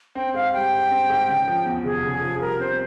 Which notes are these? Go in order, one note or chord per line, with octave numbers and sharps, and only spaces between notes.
C4 G5
G#2 F5
G3 G5
G#2
C4
G#2
C#3
F3
E2
F1 G#4
C#3
F3
G3 A#4
C4 C5